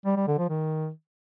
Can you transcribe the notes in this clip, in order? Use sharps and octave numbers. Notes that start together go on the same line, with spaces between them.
G3
G3
D3
F3
D#3